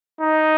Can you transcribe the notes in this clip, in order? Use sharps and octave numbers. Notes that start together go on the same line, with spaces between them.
D#4